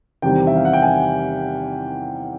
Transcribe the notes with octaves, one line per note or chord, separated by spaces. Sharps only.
E2 C3 D#3 G3 G5
E5
F5
F#5
G5
G#5